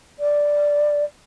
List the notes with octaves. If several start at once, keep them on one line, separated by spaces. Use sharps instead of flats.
D5